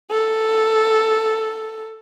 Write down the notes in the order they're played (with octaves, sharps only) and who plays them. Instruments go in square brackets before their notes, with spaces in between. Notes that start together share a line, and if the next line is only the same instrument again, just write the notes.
[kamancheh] A4